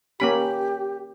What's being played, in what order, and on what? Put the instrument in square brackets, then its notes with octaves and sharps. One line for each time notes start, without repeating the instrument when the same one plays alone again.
[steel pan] A#3 C#4 B5 [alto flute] G4